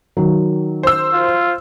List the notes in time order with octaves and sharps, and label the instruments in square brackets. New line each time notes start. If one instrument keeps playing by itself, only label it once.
[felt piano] D#3 F#3
[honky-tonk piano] C5 E6
[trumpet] F4